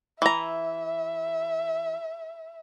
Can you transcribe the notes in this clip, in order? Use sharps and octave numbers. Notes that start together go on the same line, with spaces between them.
E3 E5 A#5